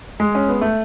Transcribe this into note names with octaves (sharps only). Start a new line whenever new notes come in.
G#3
C#4
B3
A3